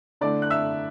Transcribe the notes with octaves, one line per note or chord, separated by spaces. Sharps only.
D3 A3 E4 D5 D6
F#6
E5 E6